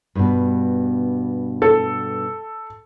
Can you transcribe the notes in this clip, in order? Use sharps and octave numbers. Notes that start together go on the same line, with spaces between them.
G2 B2
A4